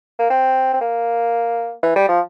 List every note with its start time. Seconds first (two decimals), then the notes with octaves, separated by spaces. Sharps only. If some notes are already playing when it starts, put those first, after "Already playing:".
0.19 A#3
0.30 C4
0.74 C4
0.81 A#3
1.83 E3
1.96 G3
2.09 F3